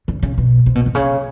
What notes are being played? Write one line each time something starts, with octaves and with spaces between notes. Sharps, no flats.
D3
C#3
B2
C3
B2
C3
C#3